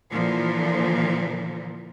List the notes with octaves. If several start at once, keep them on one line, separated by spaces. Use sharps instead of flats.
A#2 D3 E3 F3